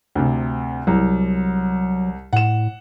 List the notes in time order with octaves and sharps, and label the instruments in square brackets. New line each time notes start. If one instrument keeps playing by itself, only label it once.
[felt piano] D2 C3
[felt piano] C2 [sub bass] F#3
[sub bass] A2 [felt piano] F#5 E7